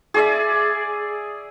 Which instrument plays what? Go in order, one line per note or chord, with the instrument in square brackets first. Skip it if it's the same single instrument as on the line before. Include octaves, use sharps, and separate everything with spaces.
[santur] G#4 D5 E5